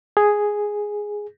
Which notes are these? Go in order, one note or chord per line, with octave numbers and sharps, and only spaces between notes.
G#4